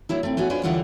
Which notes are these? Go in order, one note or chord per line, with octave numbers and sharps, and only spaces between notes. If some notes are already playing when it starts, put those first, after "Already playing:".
F#3 A#3 E4
A3 C4
A3 B3 C#4 F#4
C#4 D4 F4 B4 C5
D#2 D3 E3 A#3 F4 F#5